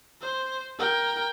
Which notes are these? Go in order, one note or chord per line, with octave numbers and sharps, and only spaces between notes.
C5
A#4 G5